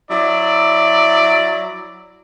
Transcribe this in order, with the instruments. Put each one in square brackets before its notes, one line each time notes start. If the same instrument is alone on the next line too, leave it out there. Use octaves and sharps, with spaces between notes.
[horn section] F#3 E4 D5